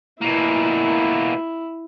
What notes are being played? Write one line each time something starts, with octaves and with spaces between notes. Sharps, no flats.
B2 A#3 E4